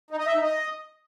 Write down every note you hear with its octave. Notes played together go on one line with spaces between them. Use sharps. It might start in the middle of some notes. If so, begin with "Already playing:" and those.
D#4
D#5
E5
D#4
D#5